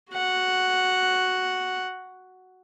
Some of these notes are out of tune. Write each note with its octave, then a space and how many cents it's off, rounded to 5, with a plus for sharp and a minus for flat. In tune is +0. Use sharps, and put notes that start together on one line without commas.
F#4 +0 F#5 +0